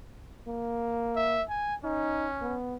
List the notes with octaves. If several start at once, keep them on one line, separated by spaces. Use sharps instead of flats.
A#3
E5
G#5
C#4 D#4
B3